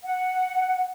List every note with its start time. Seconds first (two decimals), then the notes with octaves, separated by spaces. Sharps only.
0.04 F#5